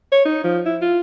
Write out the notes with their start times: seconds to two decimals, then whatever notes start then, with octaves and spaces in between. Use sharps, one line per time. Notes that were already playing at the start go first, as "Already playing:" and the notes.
0.12 C#5
0.25 D#4
0.44 F3
0.66 E4
0.81 F4